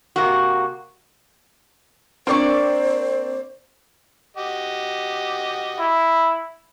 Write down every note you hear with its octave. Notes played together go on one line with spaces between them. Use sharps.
C3 A#3 F#4
A#3 C4 D4 C5 D5 C#6
F#4 G4 D#5
E4